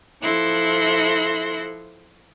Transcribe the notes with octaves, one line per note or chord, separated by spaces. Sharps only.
F3 E4 A4 C6 F#6 A#6